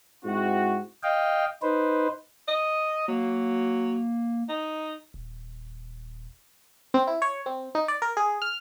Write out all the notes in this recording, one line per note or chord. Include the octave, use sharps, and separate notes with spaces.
G#2 C4 E4 F#4
D#5 F5 G5
D#4 B4 C5
D#5
F#3 A#3
D#4
D#1
C4
E4
C#5
C4
D#4
D5
A#4
G#4
F6